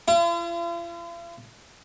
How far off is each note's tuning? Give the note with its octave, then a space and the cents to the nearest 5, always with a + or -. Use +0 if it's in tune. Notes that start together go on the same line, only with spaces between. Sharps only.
F4 -45